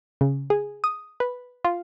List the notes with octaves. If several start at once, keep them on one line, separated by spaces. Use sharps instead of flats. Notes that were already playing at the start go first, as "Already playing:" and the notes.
C#3
G#4
D#6
B4
F4